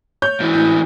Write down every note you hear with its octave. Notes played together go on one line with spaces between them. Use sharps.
C#5 G6
G#2 E3
A2